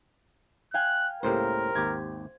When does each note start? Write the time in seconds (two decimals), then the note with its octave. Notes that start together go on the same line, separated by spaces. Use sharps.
0.74 F5 G5 G#5 F#6
1.23 C#2 A2 A#3 G4 A#4 C5
1.75 G#1 D#2 G4 G#6